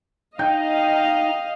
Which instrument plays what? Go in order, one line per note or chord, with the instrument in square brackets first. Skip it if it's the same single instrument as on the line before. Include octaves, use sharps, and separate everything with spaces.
[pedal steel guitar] D#4 [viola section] D#5 F5 [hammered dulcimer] G5